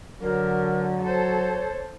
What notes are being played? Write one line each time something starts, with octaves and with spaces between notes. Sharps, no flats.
D3 F#3 A#4
A4 C5 C#5